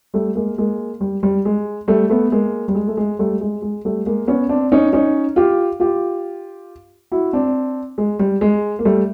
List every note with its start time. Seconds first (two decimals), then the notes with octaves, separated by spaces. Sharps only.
0.14 G3 A3
0.35 G#3 A#3
0.58 G#3 A#3
1.01 G3
1.23 G3
1.45 G#3
1.88 G3 A3
2.10 A3 B3
2.32 G#3 A#3
2.68 G3
2.75 G#3
2.87 A3
2.97 G#3
3.19 G3 A3
3.41 G#3
3.62 G#3
3.85 G3 A3
4.06 G#3 A#3
4.28 B3 C#4
4.49 C4 D4
4.72 C#4 D#4
4.93 C#4 D#4
5.36 F4 G4
5.80 F4 G4
7.12 E4 F#4
7.33 C4 D4
7.98 G#3
8.19 G3
8.41 G#3
8.79 A#3
8.85 G3 A3